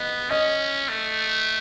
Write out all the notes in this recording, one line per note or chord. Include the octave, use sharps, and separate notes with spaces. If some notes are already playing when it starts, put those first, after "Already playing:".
Already playing: B3 D#5
C#4 D#5
A3